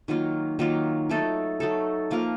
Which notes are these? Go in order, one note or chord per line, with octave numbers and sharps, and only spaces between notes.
D#3 F#3 A#3 F4
D#3 F#3 A#3 F4
F#3 A3 D#4 A4
F#3 A3 D#4 A4
F3 A#3 F4 A#4